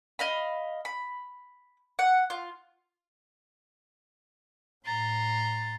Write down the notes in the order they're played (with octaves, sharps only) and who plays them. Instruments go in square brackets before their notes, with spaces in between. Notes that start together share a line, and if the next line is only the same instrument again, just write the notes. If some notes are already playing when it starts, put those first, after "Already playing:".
[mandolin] D#5 F5 B5
B5
F#5
F4
[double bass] A2 [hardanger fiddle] A#5 C6 [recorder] A6